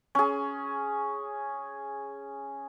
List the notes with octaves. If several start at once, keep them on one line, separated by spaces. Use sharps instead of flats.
C#4 G#4